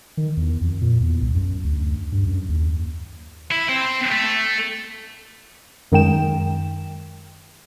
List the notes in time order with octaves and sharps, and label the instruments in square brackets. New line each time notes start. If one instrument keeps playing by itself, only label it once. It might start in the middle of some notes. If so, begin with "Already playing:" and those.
[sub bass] D#3
E2
F2
A#2
E2
C2
F#2
D2
G2
F#2
D#2
[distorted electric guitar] E4
C4
A3
[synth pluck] F#2 D#3 G#3 G5 E7